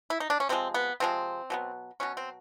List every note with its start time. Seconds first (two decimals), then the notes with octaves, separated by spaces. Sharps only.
0.10 E4
0.20 D#4
0.30 D4
0.40 C#4
0.49 C3 F3 G#3 C4
0.74 B3
1.00 C3 F3 G#3 C4
1.50 B2 F#3 B3
2.00 B2 F#3 B3 C#4
2.17 C4